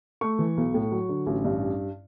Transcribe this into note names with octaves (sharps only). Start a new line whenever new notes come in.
A3 C#6
E3
B1
A2
F#3
D3
A1
G2